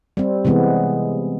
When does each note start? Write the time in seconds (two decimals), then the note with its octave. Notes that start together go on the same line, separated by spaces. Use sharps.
0.17 G3 C4
0.45 C3 E3 G#3 B3